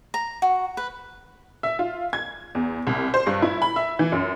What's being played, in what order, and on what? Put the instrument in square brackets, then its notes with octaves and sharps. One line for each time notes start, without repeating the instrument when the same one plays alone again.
[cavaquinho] A#5
F#4
B4
[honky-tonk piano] E5
F4
G#6
E2
C2
C5
G2
E4
B5
E5
E3
F#2